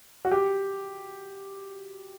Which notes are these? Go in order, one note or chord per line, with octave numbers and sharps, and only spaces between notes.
F#4
G4